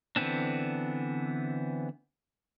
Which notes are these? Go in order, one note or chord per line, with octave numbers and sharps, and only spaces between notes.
D3 E3 B3 C4 D4